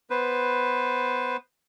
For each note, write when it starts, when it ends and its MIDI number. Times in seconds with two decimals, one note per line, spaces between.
0.10 1.37 59
0.10 1.37 71
0.10 1.37 72